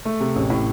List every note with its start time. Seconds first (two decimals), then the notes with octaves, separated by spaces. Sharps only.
0.05 A3
0.20 C3
0.36 A1
0.50 A2